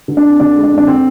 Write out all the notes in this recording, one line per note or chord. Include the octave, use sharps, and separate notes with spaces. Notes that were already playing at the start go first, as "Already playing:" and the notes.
D3
D4
F2
D3 D4
G#3
D4
F2
D4
D3 C4